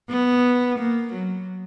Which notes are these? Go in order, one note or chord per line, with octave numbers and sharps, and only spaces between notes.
B3
A#3
F#3